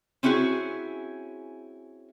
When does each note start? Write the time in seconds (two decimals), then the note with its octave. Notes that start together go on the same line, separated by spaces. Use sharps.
0.23 C4 C#4 E4 F#4 G#4